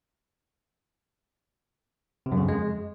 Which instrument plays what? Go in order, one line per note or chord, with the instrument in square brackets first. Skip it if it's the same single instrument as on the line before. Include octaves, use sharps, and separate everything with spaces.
[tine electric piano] C3
F#2
C#3
F2
G#3